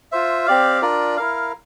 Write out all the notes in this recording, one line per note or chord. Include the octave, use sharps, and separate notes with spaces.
F4 C5 E5
C4 G4 D5 F5
D4 F4 A#4 D5
E4 A#4 F5